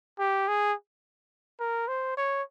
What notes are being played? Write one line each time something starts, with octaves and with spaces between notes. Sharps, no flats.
G4
G#4
A#4
C5
C#5